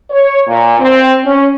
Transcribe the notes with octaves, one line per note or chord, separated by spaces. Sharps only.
C#5
A#2
C4
C#4